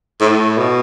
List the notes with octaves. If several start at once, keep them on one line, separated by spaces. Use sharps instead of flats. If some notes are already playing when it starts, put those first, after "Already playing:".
A2
B2